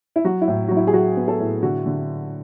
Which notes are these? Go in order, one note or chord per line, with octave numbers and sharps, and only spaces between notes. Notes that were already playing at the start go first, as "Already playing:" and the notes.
E4
F#3 F#4
E4
A2
F#3 F#4
E4
G#4
F#3 F#4
B3
A4
A2
D3 F#4
D3